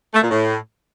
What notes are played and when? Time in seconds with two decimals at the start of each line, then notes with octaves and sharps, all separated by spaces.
0.14 A3
0.22 A#2
0.30 A2